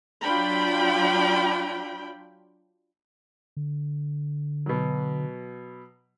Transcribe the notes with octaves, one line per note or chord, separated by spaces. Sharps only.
F#3 D4 F4 G5 B5
D3
B2 F#3